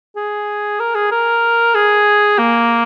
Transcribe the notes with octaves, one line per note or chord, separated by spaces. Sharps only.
G#4
A#4
G#4
A#4
G#4
A#3